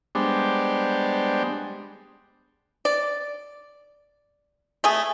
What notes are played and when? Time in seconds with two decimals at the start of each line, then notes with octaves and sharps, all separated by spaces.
0.15 G3 G#3 B3 D4 C5
2.85 D5
4.84 A3 G#4